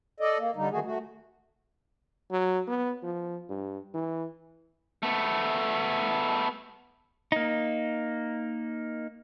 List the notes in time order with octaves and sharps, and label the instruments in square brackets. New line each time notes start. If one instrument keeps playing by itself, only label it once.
[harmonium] A4 D5 D#5
A#3
D3 G3 D#4
C3 D#3 A3 F#4 G#4
A3 F#4
[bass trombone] F#3
B3
F3
G2
E3
[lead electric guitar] A3 B3
[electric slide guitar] A#3 D#4